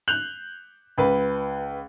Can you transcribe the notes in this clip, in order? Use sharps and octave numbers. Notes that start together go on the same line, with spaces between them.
F#6 G6 F7 F#7
C#2 B4